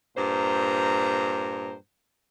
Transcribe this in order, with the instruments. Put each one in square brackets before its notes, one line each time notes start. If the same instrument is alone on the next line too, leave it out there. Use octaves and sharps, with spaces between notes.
[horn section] G2 A#2 C5 A#5